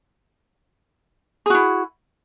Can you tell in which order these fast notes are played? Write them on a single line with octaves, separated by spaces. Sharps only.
G#4 F#4 E4